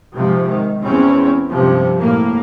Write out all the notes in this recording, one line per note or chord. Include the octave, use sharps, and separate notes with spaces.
G#2 C3 F3
D#3
E2 C4 C#4
G2 C3 F3
A2 A#3